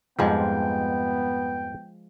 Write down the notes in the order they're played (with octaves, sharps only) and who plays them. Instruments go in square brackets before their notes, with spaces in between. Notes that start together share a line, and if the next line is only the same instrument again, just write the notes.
[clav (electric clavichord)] F2 G#2 G3 [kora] F3 G#3 [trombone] B3 [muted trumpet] G5